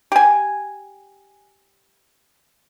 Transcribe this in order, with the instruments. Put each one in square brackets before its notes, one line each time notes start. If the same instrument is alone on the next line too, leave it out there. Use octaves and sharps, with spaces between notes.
[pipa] G4 G#5